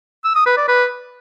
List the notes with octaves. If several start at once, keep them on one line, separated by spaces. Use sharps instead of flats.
E6
D#6
B4
D5
B4